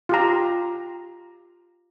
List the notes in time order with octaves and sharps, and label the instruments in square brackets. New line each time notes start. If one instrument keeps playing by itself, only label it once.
[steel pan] F4 G4 A#5